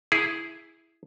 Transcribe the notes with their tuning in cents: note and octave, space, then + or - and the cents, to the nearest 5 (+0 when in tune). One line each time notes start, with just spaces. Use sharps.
E4 +0 G#4 +0